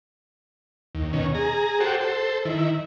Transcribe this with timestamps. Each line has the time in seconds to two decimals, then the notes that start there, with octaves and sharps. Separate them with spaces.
0.95 D#2
1.13 B2 D#3 C#4
1.35 G#4 A#5
1.80 F#4 G4 A4 C5
2.01 A4 C5
2.45 D#3 E4